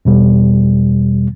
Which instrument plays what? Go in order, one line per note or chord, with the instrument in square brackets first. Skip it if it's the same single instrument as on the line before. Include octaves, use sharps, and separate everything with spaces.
[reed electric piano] E2 B2 G3